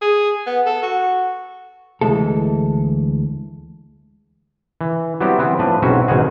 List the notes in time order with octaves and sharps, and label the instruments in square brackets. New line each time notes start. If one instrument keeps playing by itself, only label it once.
[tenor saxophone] G#4
B3
A4
F#4
[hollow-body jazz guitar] D2 E3 G#3 A3 A4
[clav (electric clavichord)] E3
F#3 G3 B3 C4 E4 G4
E3 B3 C4
A2 F3 D4 B4
B1 G#2 C4 C#4 F#4 E5
G#1 B2 D#3 G#3 F#4 G#4